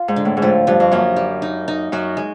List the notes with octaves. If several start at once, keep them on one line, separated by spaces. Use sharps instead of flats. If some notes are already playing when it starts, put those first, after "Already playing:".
Already playing: F4
G#2
D3
A2
G#2
A2 F3
G2 F3
F2
F#2 A#3
G3
D#4
D#4
F#2 F#4
G#3